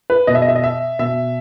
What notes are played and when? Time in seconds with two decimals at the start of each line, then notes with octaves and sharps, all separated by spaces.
0.10 B4
0.27 B2 D#5
0.35 E5
0.42 D#5
0.48 E5
0.56 D#5
0.64 E5
0.99 B2 E5